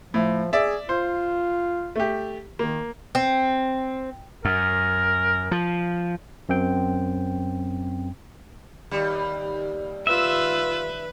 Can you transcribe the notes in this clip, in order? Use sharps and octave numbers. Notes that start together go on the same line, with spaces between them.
A2 F3
G#4 D5 E5
F4 C5
A3 G4
D#3 A#3
C4
F#2 A#4
F3
F#2 C4 G5
D#2 G3
F4 B4 E5 E6